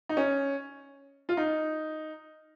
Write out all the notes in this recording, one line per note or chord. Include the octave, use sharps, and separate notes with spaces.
D#4
C#4
F4
D#4